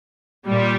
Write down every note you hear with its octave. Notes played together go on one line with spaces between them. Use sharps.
A#2 G3